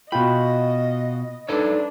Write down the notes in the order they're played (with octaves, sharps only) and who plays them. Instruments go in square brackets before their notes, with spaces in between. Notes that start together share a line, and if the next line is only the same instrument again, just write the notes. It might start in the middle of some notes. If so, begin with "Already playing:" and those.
[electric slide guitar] B2 G5 [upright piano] F4 F#4 [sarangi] D#5 [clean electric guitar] B5
[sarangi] D4 [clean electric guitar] D#4 A4 C#5 [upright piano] B4